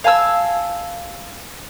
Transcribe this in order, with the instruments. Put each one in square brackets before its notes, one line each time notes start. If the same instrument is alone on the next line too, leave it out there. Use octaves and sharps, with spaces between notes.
[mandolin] F5 G#5 A5 E6